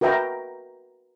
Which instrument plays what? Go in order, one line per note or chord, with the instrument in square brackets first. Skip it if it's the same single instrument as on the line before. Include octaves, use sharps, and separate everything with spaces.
[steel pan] F#4 A#4 B4 E5 G5 A#5